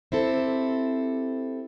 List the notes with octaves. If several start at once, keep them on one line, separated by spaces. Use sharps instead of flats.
C4 E4 G4 A4